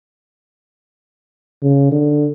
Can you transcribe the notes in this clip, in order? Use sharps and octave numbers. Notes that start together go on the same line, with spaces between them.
C#3
D3